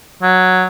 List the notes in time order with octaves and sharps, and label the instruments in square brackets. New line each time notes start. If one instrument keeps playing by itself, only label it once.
[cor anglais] F#3